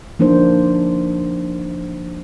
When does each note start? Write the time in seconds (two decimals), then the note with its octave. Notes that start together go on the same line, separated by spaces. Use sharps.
0.19 F3 A#3 D4 D#4 C5